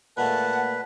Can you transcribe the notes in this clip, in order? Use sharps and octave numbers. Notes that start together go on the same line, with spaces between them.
A#2 G#3 A3 B4 F#5 A5